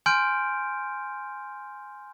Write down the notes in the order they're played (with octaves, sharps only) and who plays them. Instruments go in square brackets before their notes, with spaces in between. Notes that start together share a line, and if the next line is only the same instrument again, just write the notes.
[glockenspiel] G#5 C6 F6 G6 D7